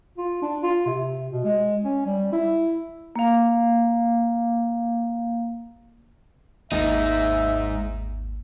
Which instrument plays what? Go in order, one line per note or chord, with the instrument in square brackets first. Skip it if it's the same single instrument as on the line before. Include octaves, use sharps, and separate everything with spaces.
[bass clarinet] F4
D4
F4
C3
B2
G#3
C#4
G3
E4
[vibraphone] A#3 F5
[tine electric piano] G#1 D#2 [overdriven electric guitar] G#2 D#4 [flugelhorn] E5